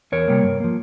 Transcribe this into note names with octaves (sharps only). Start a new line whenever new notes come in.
E2 A#4 C#5
C3 G3 A#3
G2
F3 A#3